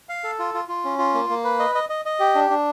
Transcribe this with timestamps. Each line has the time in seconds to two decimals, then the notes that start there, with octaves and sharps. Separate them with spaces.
0.09 F5
0.24 A4
0.39 F4
0.54 F4
0.68 F4
0.85 C#4
0.99 F4
1.14 A#3
1.30 A#3
1.44 B4
1.59 D#5
1.75 D#5
1.89 D#5
2.05 D#5
2.19 G4
2.35 D4
2.50 D4